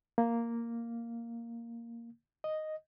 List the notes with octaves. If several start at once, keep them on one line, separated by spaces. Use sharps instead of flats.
A#3
D#5